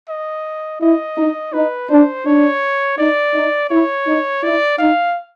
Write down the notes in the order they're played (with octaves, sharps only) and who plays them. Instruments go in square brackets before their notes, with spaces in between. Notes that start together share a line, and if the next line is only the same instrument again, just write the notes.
[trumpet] D#5
[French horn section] E4 [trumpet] D#5
[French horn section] D#4
[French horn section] D#4 [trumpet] B4
[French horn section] D4 [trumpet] C5
[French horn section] D4 [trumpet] C#5
[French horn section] D#4 [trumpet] D5
[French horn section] D#4
[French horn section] E4 [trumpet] C#5
[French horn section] D#4
[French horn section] E4 [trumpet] D5
[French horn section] D#4 [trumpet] F5